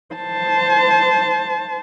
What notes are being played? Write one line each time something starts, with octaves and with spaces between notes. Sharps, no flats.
C5 A5